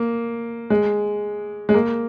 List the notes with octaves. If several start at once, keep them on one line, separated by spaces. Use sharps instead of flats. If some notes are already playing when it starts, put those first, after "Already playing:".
Already playing: A#3
G#3
G#3
A#3